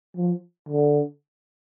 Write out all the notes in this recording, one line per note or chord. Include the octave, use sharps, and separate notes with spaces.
F3
D3